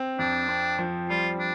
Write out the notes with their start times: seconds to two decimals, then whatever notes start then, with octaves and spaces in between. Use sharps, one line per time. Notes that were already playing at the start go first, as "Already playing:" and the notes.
Already playing: C4
0.19 F2 D4
0.49 C4
0.79 F3
1.09 G3 F4
1.39 D4